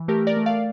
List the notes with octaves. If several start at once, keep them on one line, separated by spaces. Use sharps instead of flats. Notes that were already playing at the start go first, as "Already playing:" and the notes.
Already playing: E3
A3 G4 A#4
A#4 D5
A3
D5 F5